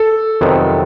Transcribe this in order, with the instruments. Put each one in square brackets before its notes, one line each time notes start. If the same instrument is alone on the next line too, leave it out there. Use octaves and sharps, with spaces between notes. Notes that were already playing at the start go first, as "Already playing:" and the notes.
Already playing: [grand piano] A4
[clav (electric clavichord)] F2 C3 D#3 F#3 B3